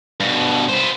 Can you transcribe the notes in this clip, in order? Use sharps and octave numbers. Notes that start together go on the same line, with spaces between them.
G2 B2
B3 C5